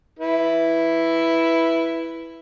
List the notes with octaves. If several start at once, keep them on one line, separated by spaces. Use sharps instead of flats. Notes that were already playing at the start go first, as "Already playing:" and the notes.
E4 B4